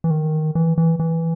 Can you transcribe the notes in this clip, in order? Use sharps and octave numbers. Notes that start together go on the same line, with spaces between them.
E3
D#3
E3
E3
E3